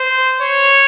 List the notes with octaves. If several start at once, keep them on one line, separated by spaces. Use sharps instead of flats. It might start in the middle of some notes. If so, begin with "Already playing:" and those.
Already playing: C5
C#5